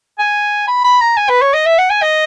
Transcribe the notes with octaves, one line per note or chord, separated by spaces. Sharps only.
G#5
B5
B5
A#5
G#5
B4
C#5
D#5
E5
F#5
G#5
D#5